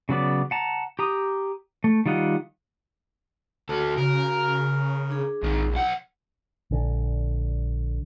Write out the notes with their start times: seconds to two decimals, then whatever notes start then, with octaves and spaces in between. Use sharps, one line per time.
0.09 C#3 F#3 B3 D5
0.51 F#5 A5 A#5
0.99 G4 A#5 D#6
1.84 A3
2.06 D#3 G3 F4 D#5 F#5
3.69 D2 F#4 A4
3.98 C#3 A#4
5.10 D4 G#4
5.43 A#1 G#2 D#3
5.73 B1 F#5
6.71 A#1 D3